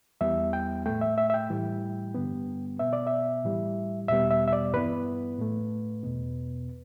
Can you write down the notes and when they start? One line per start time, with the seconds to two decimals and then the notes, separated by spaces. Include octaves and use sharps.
0.21 E2 E3 G3 B3 E5
0.53 G5
0.86 A2 A3 G5
1.01 E5
1.18 E5
1.30 E5
1.34 G5
1.50 A2 E3 G3
2.15 G2 D3 G3 B3
2.79 B2 B3 E5
2.93 D5
3.07 E5
3.44 A2 E3 G3
4.08 E2 B2 G3 B3 E5
4.31 E5
4.48 E5
4.53 D5
4.74 G2 E3 B3 B4
5.39 A2 A3
6.03 E2 B2 B3